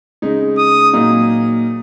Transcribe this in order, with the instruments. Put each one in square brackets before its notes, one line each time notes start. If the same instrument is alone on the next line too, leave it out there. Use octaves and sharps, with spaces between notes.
[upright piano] C#3 G#3 D#4
[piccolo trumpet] D#6
[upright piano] A#2 F#3 A#3 D#4